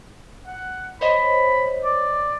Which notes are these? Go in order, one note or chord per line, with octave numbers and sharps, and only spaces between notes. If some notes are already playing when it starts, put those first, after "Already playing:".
F#5
C5 C#5 D#5 B5
D5